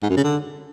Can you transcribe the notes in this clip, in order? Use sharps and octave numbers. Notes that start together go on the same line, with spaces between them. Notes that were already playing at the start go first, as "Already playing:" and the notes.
G#2
F#2
C#3
D3